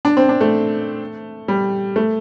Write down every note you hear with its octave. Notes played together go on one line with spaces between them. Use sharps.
D4
C4
D4
A3
G3
A3